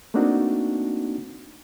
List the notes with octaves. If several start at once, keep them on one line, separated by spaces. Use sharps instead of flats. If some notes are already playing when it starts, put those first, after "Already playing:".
A3 A#3 C4 D4 D#4 F#4